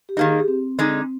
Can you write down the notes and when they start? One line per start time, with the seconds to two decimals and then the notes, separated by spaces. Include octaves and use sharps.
0.09 G4
0.17 D#3 A#3 D#4 G#4
0.28 G#4
0.38 G4
0.48 C4
0.79 D3 G#3 D#4